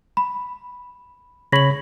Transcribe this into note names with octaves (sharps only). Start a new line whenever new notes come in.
B5
C#3 C#5 B5 A#6 F#7